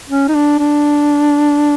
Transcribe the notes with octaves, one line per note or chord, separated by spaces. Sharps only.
C#4
D#4
D4
D4